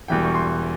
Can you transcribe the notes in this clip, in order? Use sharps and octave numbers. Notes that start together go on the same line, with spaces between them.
E1 E2 E3 G3 G5
C#6
C6